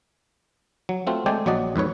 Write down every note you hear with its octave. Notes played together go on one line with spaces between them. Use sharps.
F#3
A3 C4 F4 F#4
G#3 A3 C4 D5 G5 G#5
A#1 F#3 F#4 D5 D#5
F2 G#2 B4 C#5